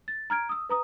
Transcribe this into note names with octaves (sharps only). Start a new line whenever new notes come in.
A6
A#5 F6 G#6 D7
D#6 E6
B4 A#5 D#6